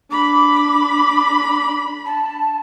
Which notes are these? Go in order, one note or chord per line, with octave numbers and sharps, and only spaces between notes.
D4 B5 D6
A5